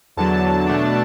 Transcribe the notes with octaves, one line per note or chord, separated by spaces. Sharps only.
E2 D3 F#3 A5
B2 A3 D4